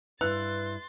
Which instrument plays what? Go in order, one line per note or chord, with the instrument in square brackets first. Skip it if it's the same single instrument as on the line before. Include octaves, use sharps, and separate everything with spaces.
[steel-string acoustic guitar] G2 E4 [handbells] B4 [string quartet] C6 A6 [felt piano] F#6